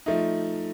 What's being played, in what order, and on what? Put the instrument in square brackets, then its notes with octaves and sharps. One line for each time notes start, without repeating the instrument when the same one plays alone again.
[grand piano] F3 A3 D#4